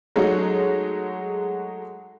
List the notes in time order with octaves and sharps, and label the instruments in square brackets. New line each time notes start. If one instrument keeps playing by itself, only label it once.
[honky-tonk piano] F#3 G#3 A3 D#4 F#4